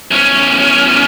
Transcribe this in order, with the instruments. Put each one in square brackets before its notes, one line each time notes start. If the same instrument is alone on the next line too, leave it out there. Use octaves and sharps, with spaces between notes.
[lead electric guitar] E2 C#4